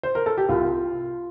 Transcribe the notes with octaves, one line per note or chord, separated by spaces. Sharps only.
C5
A#4
A4
G4
C2 F4